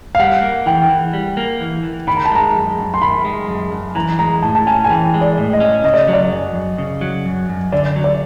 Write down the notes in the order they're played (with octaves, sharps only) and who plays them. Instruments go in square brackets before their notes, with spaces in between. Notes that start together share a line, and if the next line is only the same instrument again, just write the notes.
[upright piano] F5
[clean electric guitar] G3 [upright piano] F#5
[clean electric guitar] A#3
[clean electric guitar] E3 [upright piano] G5
[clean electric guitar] E3
G3
A#3
E3
E3
[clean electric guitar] D#3 [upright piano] B5
[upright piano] A#5
A5
[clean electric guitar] G#3 [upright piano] A#5
[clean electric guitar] F#2
F#2
[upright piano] C6
[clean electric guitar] D#3 [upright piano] B5
[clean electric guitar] G#3
F#2
F#2
[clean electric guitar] E3 [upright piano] A#5
[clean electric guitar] G#3 [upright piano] A#5
[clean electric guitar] A2 [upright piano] A5
[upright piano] A5
[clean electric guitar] C#4 [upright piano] G#5
[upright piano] G#5
[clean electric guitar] E3 [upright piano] G5
[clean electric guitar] G#3
[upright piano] D5
[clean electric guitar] A2
[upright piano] D#5
[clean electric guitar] C#4
[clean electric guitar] C#3 [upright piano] D#5
[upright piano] D5
[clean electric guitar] F#3
[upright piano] D5
[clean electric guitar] F#2
F#2
C#3
F#3
F#2
F#2
[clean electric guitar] D3 [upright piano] D5
[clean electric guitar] F#3
[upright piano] D5